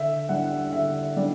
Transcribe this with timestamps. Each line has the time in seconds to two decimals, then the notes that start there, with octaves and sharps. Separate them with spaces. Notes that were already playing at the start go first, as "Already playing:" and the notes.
Already playing: D3 E5
0.29 G3 D4 F#5
0.73 D3 E5
1.17 G3 D4